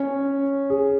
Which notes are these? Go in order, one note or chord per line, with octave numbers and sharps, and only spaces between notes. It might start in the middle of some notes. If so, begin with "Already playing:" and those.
Already playing: C#4 C#5
G#4